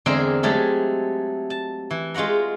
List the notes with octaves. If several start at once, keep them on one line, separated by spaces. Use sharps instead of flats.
E2 D3 G#3 C4 A#4
F#3 G#3 A3 G4 A4
A5
E3
G#3 F4 F#4 F#5 A#5